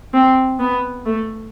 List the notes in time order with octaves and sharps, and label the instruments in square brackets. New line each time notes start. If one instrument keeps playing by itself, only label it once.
[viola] C4
B3
A3